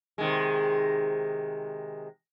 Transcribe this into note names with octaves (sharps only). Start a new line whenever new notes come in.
C3 D#3 G#3